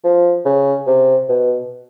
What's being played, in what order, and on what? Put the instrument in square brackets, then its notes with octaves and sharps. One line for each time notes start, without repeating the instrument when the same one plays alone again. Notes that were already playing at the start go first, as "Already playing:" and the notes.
[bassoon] F3
C#3
C3
B2